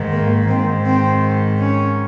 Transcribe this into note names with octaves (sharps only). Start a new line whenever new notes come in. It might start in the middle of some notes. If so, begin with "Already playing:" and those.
Already playing: G#2 D#3
A#3
G#2 D#3 C4
C4
C#4